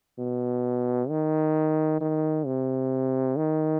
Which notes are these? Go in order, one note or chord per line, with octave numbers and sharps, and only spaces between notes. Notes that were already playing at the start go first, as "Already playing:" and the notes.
B2
D#3
D#3
C3
D#3